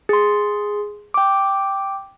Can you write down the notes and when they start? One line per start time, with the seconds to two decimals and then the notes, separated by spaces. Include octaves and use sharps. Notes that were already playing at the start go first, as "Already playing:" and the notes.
0.09 G#4 C6
1.14 G5 D6